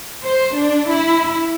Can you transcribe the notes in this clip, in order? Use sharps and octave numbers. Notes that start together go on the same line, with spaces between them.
C5
D4
E4